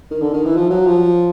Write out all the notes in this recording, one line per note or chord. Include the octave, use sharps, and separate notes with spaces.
D#3
D3
D#3
E3
F3
F#3
F3